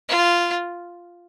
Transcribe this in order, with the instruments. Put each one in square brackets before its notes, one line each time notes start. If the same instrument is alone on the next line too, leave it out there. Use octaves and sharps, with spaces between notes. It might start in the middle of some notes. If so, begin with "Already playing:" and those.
[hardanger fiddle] F4